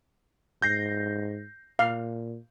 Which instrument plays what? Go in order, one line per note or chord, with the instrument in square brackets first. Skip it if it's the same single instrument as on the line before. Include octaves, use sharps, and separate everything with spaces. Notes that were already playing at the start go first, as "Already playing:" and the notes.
[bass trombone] G#2 [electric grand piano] G6 A#6 C7
[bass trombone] A#2 [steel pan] F5